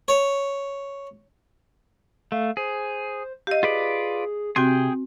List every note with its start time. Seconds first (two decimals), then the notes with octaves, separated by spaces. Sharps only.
0.08 C#5
2.32 A3 F5
2.57 G#4 C5
3.47 G4 D#5 F5
3.63 F4 G#4 B4 D5
4.56 C3 C4 F#4 G#4 G5 G#5